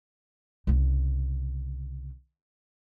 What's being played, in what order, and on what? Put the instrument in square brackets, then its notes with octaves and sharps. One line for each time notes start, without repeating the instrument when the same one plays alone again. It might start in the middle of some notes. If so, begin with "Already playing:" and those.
[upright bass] C2 C#3